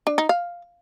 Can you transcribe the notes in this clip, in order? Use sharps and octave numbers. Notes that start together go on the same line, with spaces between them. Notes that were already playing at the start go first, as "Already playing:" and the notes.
D4
D#4
F5